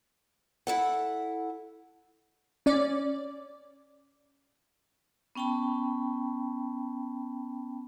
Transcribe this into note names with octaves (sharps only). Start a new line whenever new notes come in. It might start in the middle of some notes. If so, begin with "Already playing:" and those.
E4 A4 F#5
C#4 D5
B3 C#4 G5 A5 B5